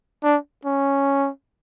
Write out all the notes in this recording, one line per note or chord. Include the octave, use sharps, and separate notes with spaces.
D4
C#4